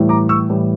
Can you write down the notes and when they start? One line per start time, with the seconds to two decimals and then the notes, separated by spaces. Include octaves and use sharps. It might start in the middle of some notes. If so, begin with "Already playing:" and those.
Already playing: A2 E3 G3
0.09 A#5 D6
0.29 C#6 E6
0.50 A2 E3 G3